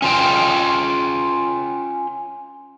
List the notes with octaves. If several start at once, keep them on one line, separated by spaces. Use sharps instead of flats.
C#4 F4 G5